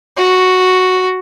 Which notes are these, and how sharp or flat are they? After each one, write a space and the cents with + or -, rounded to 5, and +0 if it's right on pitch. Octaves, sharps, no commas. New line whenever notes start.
F#4 +0